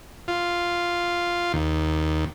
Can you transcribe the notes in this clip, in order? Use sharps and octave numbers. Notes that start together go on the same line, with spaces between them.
F4
D#2